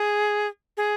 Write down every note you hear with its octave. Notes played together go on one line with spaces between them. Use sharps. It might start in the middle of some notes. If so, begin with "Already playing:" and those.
Already playing: G#4
G#4